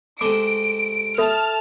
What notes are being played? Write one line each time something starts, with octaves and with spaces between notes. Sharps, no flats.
C3 G#3 A3 D6 D7
A4 E5 A5 F6